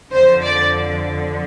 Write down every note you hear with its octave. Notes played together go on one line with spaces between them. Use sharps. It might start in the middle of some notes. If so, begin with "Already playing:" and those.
F2 D3 F3 C5
D5